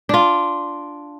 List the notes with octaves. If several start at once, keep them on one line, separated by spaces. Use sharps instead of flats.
D4 F4